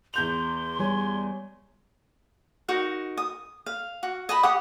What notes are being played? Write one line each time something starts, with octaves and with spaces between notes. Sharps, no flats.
E2 C6 G6 F7
G3 C#5 G#5
D#4 F#4 A#4
D#6
F5
F#4
D#5 A5 B5
G4 F#5 D#6